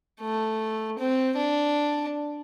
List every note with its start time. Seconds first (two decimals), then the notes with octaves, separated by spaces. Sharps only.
0.21 A3
0.98 C4
1.37 D4